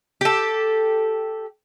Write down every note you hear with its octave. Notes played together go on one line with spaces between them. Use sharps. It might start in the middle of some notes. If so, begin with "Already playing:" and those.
G4 A4